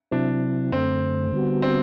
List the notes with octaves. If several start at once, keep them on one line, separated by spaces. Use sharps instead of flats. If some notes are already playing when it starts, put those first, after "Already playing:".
C3 F#3 C4 D4 E4
F#2 D3 A3 C4
D3 G3 B3 F#4
C4